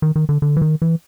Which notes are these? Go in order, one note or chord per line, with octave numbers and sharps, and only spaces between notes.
D#3
D#3
D3
D3
E3
D#3
E3